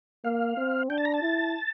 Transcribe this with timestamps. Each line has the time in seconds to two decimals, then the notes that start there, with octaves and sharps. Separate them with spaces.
0.24 A#3 F5
0.57 C4
0.89 D4 G5
0.98 A5
1.05 A#5
1.14 A5
1.22 E4